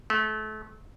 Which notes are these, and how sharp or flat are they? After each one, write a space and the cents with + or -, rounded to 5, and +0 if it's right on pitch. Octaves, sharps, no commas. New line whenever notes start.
A3 -30